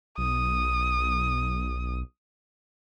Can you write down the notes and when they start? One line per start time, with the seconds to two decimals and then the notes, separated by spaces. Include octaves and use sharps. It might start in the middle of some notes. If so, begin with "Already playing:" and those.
0.18 B1 D#6